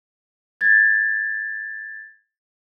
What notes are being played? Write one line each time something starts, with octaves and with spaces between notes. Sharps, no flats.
G#6 A6